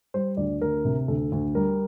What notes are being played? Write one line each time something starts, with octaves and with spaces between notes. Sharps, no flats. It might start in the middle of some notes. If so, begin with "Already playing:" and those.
G3 C5
D2 D5
D2 A#4
C3
D2 A4
D2
G3 A#4